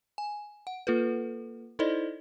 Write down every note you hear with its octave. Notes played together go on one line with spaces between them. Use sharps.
G#5
F#5
A#3 F4 A4 B4
D#4 E4 A4 C5 D5 D#5